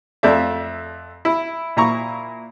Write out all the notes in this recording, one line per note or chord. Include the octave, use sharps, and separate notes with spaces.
F2 A3 D5 E5
E4
A#2 E4 A#5 C#6